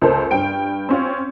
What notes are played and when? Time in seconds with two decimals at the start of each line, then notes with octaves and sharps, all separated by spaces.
0.01 C#2 A#3 A4 C5
0.31 G2 G5 D7
0.89 C4 C#4 F4